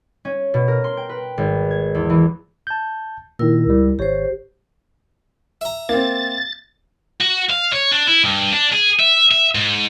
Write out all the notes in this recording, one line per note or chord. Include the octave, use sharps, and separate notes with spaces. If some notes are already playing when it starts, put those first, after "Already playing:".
C#4
B2
A#4
C6
G5
B4
G#1
G#6
E2
E3
A5 G6
A#2 D#3 E4 A#4 E6
C#2 G3
G#1 G4 C5 C#5
E5 A#5
A#3 C4 A6
F#4
F5
C#5
D4
E4
G2
D4
G#4
E5
E5
G#2